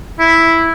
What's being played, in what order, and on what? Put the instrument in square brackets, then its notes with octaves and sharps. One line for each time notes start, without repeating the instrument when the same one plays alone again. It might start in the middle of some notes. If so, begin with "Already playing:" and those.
[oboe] E4